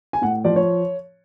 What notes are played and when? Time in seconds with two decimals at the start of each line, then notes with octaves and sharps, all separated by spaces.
0.13 G#5
0.22 A2 F#5
0.44 F3 D5
0.56 C#5